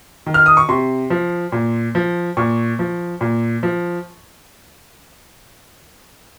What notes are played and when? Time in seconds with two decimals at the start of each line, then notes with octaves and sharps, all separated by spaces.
0.26 D#3
0.34 F6
0.46 D#6
0.57 C#6
0.69 C3 C6
1.10 F3
1.52 A#2
1.95 F3
2.37 A#2 C#6
2.79 F3
3.21 A#2
3.63 F3